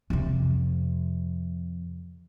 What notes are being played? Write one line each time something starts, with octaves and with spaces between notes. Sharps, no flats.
F2 C3